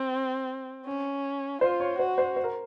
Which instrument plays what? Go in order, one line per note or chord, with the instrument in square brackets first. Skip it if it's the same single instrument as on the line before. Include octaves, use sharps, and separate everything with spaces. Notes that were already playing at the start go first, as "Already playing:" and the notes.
Already playing: [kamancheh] C4
C#4
[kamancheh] F4 [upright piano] C5
[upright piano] C#5
[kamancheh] F#4 [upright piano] C5
[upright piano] C5
C5
A#4